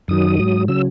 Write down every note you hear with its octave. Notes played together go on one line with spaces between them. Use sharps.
F#2 D#3 F#3 D#6
G#2 F#3
C#3 F#3 E6